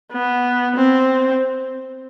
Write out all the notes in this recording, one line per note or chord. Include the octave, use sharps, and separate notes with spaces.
B3
C4